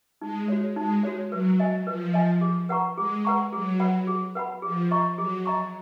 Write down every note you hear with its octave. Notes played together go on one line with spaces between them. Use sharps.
G#3 D#4
F#4 C#5
G#3 D#4
F#4 C#5
F#3 B4
D#5 G#5
F3 B4
D#5 G#5
G#4
B4 F#5 A#5 C#6
G#3 G#4
B4 F#5 A#5 C#6
F#3 G#4
B4 F#5 B5
G#4
B4 F#5 B5
F3 G#4
D#5 A#5 C#6
F#3 G#4
D#5 A#5 C#6